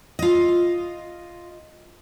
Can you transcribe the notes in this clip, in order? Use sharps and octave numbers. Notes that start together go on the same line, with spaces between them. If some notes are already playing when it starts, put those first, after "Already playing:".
F4 D#5